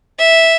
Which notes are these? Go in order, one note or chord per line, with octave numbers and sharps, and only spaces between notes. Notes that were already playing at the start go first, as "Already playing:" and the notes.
E5